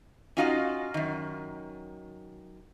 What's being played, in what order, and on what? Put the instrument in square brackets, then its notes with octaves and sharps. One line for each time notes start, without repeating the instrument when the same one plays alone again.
[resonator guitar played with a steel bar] C#4 D#4 F4 F#4 D#5 F5
F#2 D#3